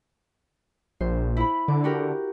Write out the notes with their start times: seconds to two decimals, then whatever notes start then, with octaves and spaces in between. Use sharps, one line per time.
1.01 A#1 C5
1.37 E4 B5
1.68 D3 D6
1.84 F#4 G4 A#4